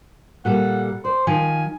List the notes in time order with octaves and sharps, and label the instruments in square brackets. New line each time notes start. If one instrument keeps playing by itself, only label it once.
[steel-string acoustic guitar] A#2 G3 A4 [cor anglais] F#5
[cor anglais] C5 [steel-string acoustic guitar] D5
[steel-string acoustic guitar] D#3 F3 [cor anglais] G#5